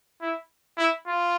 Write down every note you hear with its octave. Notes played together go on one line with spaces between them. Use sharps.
E4
E4
F4